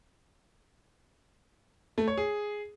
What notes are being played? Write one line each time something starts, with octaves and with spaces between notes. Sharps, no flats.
A3
C#5
G#4